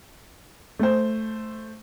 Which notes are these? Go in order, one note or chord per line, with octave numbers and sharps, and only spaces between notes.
A3 C5